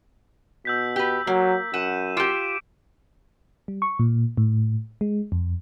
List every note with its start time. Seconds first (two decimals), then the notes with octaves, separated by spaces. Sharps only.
0.65 B2 E6 G6 B6
0.96 G4 B4
1.27 F#3 A#3
1.74 F#2 F#5 D#7 E7
2.17 F4 G4 D6 C#7 D7
3.68 G3
3.82 C#6
3.99 A#2
4.37 A2
5.01 G#3
5.32 F2